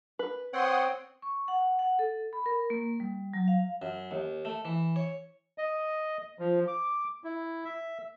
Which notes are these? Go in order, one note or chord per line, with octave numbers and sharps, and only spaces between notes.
B4
C4 C#5 F#5 G5 C6 D#6
C#6
F#5
F#5
A4
B5
A#4
A#3
G3
F#3
F5
F#2
D#2
A3
E3
C#5
D#5
F3
D6
E4
E5